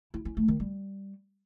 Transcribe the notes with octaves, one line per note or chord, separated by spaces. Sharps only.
E4
C#4
A3
D#3
G3